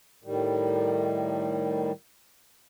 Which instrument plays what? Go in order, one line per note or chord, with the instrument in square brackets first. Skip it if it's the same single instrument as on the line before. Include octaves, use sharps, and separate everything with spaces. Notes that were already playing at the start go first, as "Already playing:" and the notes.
[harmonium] A2 D#3 G3